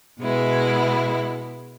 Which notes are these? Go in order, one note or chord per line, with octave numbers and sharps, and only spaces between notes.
B2 G#3 B3 E4